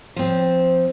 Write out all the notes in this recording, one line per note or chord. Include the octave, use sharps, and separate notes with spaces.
F3 C4